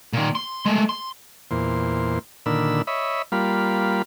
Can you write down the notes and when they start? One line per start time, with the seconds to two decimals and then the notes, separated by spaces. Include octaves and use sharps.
0.13 A#2 D#3
0.35 C6
0.65 G#3 A3
0.89 C6
1.51 E2 A#2 C5
2.46 A#2 D3 D#3 B5 E6
2.87 C#5 D#5 E5 B5
3.32 G3 A#3 F4 B5